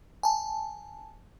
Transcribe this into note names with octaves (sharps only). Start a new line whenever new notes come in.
G#5 A5